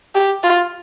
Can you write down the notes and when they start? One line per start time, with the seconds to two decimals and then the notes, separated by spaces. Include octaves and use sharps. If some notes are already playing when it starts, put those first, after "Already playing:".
0.15 G4
0.44 F4